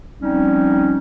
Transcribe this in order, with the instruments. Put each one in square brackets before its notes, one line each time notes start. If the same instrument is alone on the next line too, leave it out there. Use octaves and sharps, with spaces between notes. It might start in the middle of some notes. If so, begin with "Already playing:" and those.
[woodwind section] F3 G3 C4 C#4 D#4